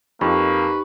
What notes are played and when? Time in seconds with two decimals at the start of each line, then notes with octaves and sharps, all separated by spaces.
0.21 F2 A#3 D#4 G4 B4 C#6